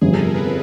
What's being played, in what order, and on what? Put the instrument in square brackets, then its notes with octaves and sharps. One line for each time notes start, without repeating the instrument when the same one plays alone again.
[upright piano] G1 F2 C3 [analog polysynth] G#4
[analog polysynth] A4
A#4
B4
[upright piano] C3